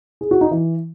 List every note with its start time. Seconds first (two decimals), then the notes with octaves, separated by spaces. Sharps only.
0.21 G#4
0.31 F#4
0.41 D#4
0.51 E3